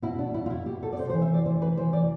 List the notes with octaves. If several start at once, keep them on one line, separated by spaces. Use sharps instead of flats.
B2 E4
B2 D4
B2 E4
F4
B2 E4
B2 G4
B2 A4
D5
C3 C5
C5
E3
E5
C3 D5
E3 C5
C3 B4
E3 C5
C3 D5